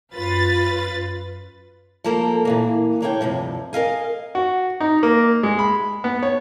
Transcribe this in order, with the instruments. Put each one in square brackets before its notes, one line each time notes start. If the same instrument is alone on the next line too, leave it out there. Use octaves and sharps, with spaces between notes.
[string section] F#2 F4 B4 A6
[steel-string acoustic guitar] F3 G3 A#3 A4 A#4
A#2 E3 A#3
A#3 D4 G4 C#5 E5 G5
D2 G2 C3 F3
A#4 D#5 F5 G#5
[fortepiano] F#4
D#4
A#3
G#3
B5
B3
C#5